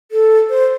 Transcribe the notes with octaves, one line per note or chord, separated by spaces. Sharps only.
A4
C5